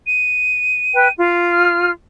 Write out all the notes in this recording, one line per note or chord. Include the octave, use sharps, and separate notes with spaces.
D#7
B4 G5
F4
F6